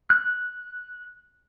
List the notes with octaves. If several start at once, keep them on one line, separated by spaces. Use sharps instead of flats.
F#6